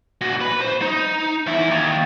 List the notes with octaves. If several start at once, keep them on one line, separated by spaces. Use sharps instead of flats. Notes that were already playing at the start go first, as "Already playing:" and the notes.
A#2 F#4
B4 B5
C5
D#4
E2 E4
D#2